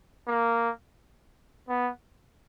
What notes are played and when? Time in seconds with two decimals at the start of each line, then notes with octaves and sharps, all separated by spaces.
0.27 A#3
1.69 B3